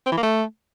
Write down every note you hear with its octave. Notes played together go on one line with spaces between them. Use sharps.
C4
E3
A#3
A3